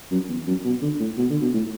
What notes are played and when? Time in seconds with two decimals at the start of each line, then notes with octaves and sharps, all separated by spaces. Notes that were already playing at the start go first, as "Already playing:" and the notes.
0.11 F#2
0.29 E2
0.47 F#2
0.64 B2
0.82 D3
1.00 A2
1.17 B2
1.30 D3
1.41 B2
1.54 A2